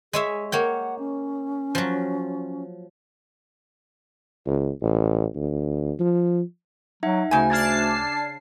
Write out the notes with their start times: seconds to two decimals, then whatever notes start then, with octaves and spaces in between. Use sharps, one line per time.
0.13 G#3 G#4 C#5 E5
0.52 A#3 C#5 F#5 G5
0.99 C#4
1.75 F3 F#3
4.46 C#2
4.82 A1
5.35 D2
6.00 F3
7.03 F#3 D#4 E5 F#5
7.31 D2 C#3 G#5
7.50 D4 A5 F6 G#6 A6 C7